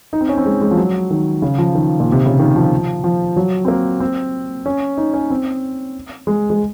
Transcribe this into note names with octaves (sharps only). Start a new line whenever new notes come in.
D#4
C4
C#4
C4
G#3
G#3
F3
F#3
D#3
C#3
F3
D#3
A#2
C3
C#3
D#3
F3
F3
F#3
C4
A#3
C4
C#4
D#4
C#4
C4
G#3
G#3